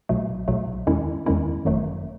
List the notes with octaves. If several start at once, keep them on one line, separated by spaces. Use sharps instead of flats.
B1 B2 F#3 A3
B1 B2 F#3 A3
E2 D#3 G#3 C#4 E4
E2 D#3 G#3 C#4 E4
G#1 F#2 D#3 F#3 A3